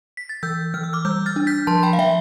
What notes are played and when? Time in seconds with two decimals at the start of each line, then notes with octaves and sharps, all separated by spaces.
0.17 B6
0.29 A6
0.43 E3 E6 G6
0.74 E3 F6
0.84 E6
0.93 D6 F6
1.05 G3 E6 G6
1.26 F6 A6
1.36 D4
1.47 G6 B6
1.67 F3 A5 C6
1.83 G5 B5
1.93 F5
1.99 F3 E5 G5